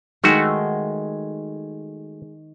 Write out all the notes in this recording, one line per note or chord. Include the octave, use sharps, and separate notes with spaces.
D#3 G#3 A3 F#4